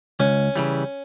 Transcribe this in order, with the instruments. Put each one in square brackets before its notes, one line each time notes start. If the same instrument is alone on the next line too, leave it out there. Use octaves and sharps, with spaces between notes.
[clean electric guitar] C#2 [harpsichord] C#4
[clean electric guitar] C#3 E3 G3